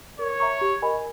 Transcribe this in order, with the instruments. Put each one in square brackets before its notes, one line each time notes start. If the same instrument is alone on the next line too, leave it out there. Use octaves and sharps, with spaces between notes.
[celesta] A#4 [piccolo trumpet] C#5
[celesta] E5 A#5 C#6
G4
A#4 D#5 G#5 B5